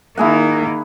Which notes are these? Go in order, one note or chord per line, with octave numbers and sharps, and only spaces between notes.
D#3 A#3 E4 G#4 F#5